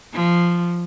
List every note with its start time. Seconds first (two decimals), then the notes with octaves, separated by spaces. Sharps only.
0.14 F3